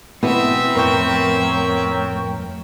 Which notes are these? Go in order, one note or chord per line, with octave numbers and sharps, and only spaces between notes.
B2 E3 B3 C4 E5
F2 A2 A#4 C#5 G5